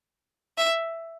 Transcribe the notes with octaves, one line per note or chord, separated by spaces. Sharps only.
E5